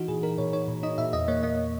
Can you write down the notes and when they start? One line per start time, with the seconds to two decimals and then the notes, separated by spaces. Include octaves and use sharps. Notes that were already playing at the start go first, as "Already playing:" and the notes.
Already playing: E3 D#4 F#4
0.08 A#2 G#4
0.23 D#4 A#4
0.38 A#2 C#5
0.53 D#4 C#5
0.68 A#2
0.83 D#4 D#5
0.98 A#2 E5
1.13 E2 D#5
1.28 A#3 C#5
1.43 A#3 D#5